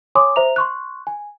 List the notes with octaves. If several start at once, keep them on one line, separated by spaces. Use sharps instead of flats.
C#5 G#5 C6 D6 D#6
C5 E5 A#5 F7
C6 C#6 F#6
G#5